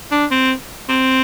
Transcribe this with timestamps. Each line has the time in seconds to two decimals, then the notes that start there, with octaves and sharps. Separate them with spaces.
0.12 D4
0.31 C4
0.89 C4